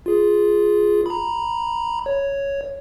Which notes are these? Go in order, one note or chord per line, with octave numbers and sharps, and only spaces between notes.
F4 G#4
A#5 B5
C#5